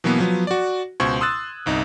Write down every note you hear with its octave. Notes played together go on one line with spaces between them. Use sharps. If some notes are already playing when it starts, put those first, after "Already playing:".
B2 E3 F#3 A#3 B3
F3 F#3 B3
F#4 D5
C#2 B2 C5 C#6 G#6
C6 D#6 E6 F#6 A6
G1 C2 D#4